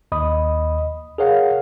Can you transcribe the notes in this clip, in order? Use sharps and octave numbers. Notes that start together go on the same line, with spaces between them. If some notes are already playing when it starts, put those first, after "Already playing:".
D#2 D#5 B5 D#6
G#4 A#4 C#5 F5 F#5